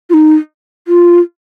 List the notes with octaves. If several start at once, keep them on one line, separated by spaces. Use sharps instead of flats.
F4
D#4
F4